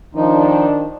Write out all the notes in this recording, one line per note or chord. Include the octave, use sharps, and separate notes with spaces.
D#3 F3 D4 D#4